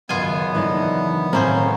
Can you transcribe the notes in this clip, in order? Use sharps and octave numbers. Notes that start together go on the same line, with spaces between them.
G#1 C#2 F#2 B3 F4 G#5
E3 D4 D#4
G#1 A2 A#3 C4 C#4 C5 C6